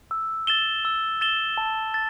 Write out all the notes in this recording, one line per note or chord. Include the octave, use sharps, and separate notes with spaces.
E6
A6 E7 G7
E6
A6 E7 G7
A5
A6